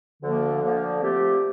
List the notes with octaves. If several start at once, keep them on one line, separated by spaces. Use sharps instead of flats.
D2 D3 F3 A#3
D2 D3 F3 A#3
A#2 F3 A3 C4 G4